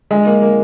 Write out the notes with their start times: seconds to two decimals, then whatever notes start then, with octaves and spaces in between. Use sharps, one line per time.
0.11 G#3
0.26 A#3
0.42 A#3